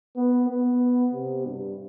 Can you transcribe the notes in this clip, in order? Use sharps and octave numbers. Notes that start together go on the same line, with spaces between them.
B3
B3
C3
G2